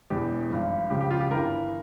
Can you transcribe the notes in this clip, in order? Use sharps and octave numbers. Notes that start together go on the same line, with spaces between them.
E1 E2 E3 G4
G#1 G2 F3
C#2 C#3 F3 G4
G4
F4
G4
G1 G2 E3 A#4